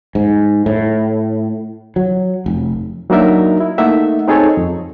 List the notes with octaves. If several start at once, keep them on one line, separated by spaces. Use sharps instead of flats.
G#2
A2
F#3
F1
F#3 A#3 D4 D#4 A#4 E5
E4
A3 A#3 D#4 E5 F#5
C4 D#4 G#4 A4 C#5
F2